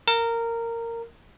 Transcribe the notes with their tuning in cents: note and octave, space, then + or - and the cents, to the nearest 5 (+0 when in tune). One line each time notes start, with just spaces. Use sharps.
A#4 -15